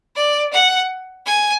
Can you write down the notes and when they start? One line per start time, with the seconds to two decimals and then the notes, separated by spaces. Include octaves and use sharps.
0.16 D5
0.52 F#5
1.26 G#5